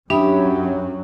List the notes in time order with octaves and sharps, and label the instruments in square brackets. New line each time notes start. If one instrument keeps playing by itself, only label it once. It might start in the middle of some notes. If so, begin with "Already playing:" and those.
[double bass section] F#2 F#3 [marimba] D4 E5 D#6 [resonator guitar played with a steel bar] E4 [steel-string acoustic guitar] G4